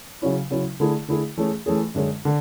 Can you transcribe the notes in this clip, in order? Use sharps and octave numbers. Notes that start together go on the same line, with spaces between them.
C#3 F#3 C#4 E4
C#3 F#3 C#4 E4
D3 A3 E4 G#4
D3 A3 E4 G#4
E3 A3 C#4 G#4
E3 A3 C#4 G#4
F#2 D3 G#3 C#4
D3